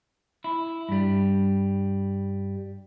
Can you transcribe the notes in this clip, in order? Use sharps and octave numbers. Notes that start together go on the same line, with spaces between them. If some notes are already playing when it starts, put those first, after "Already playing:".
E4
G2 G3